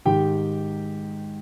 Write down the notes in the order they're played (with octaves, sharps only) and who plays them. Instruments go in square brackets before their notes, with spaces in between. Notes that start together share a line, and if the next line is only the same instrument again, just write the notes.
[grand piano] G#2 D#3 G4 G5